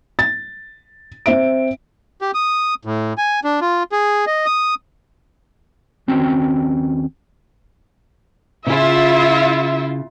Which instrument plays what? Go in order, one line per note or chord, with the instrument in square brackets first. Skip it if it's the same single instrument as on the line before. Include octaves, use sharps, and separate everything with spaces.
[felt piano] A6
C4 E5 D7
[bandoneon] G4
D#6
A2
G#5
D4
F4
G#4
D#5
D#6
[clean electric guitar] D#2 C4 C#4 F#4 G5
[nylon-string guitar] C#3 G#4 [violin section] E4 F4 [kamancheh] E5